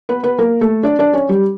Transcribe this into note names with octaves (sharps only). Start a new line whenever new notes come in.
B3 B4
B3 B4
A#3 A#4
A3 A4
D4 D5
D4 D5
C#4 C#5
G3 G4